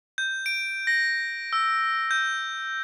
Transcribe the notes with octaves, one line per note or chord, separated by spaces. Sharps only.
G6
D7
A#6
E6
G6